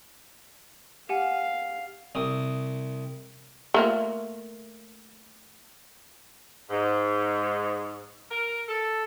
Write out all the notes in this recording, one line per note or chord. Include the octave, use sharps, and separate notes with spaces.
G4 F5 F#5 G#5
C2 D#6
A3 A#3 F4
G#2
A#4
A4